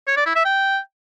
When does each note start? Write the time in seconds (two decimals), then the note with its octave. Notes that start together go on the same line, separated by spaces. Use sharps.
0.07 C#5
0.17 D5
0.26 E4
0.35 E5
0.45 G5